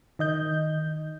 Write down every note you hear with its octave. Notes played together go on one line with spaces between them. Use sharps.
D#3 D#5 G6